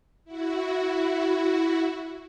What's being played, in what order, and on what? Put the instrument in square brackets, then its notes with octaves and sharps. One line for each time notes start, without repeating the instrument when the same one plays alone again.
[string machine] E4 F#4